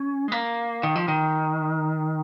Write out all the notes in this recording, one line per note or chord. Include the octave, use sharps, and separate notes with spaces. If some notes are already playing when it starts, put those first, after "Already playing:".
Already playing: C#4
G#3
A#3
D#3
F3
D#3